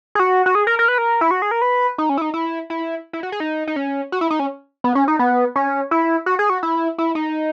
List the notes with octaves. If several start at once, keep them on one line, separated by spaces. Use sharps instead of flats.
G#4
F#4
F#4
G#4
A#4
A#4
B4
A#4
E4
F#4
G#4
A#4
B4
D#4
C#4
E4
D#4
E4
E4
E4
F#4
G#4
D#4
D#4
C#4
F#4
E4
D#4
C#4
B3
C#4
D#4
B3
C#4
E4
F#4
G#4
F#4
E4
E4
D#4